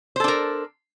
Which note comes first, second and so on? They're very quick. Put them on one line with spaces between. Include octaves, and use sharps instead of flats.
C5 A4 D4 A#4